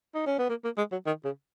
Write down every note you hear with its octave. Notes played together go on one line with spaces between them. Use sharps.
D#4
C#4
B3
A#3
A#3
G#3
F#3
D#3
C#3